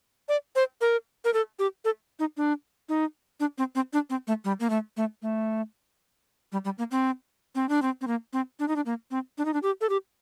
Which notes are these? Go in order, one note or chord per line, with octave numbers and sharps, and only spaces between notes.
D5
C5
A#4
A#4
A4
G4
A4
D#4
D4
D#4
D4
C4
C4
D4
C4
A3
G3
A#3
A3
A3
A3
G3
G3
A#3
C4
C4
D4
C4
C4
A#3
C4
D4
D#4
D4
A#3
C4
D4
D#4
D4
G4
A4
G4